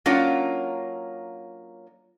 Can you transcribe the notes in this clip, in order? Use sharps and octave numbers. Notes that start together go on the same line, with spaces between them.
F#3 A#3 C#4 D4 F4